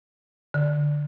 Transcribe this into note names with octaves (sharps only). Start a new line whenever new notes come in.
D3